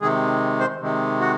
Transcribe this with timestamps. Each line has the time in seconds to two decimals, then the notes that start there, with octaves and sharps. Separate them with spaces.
0.01 C3 D#3 G#3 G#4
0.60 C5
0.80 C3 D#3 G#3
1.20 F#4